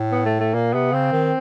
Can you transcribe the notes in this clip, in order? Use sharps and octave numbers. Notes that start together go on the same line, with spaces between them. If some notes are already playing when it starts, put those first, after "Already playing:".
Already playing: A2
B3
A3
A3
A#2 A#3
C3 B3
C#3 C4
D#3